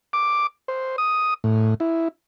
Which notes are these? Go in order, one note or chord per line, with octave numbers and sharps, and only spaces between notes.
D6
C5
D#6
A2
E4